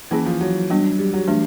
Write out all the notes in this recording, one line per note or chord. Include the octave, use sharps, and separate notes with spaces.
E3 A#3 C#4 E4 G#4
F3
F#3
G3 B3 D4
G3
F#3
E3 G3 A3 D4